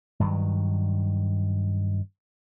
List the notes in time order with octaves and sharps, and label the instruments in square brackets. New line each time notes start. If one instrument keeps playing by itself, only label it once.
[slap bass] G2 D#3 F#3